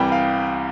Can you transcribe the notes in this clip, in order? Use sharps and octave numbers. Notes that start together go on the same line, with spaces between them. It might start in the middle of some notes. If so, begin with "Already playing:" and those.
Already playing: C2 C3 E3 G3 G5
F5